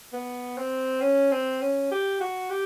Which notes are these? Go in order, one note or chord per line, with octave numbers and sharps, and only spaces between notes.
B3
C4
C#4
C4
C#4
G4
F#4
G4